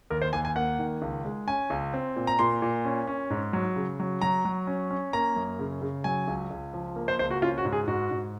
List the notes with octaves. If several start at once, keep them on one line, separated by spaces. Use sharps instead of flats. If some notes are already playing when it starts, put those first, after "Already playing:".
D#2 A#4
C5
D#2 G#5
G#5
A#3 F#5
D#3
C#2
G#3
C#4 G#5
C#2
C4
A#2
A#5
A#2 C6
A#2
C#4
C#4
G#2
F#3
C#3
F#3
F#3 A#5
F#3
C#4
C#4
A#3 A#5
F#2
C#3
C#3
F#3 G#5
C#2
C#2
F3
A#3
C5
C#2 C5
F#4
C#4 F4
F#4
G#2
G#4
G#2 F#4
G#2